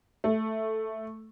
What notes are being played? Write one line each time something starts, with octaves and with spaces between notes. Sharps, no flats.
A3